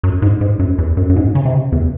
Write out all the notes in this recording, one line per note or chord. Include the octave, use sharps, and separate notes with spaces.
F#2
G#2
G#2
F#2
E2
F#2
F#2
G#2
C#3
C3
C#3
E2